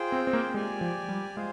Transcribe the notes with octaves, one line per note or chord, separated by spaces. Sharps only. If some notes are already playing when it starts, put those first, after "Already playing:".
Already playing: F4 G#4 C5 G5
C4
C4
A#3
G#3 G4 D5 G#5
F3
G3
G#3 F4 G#4 C5 F5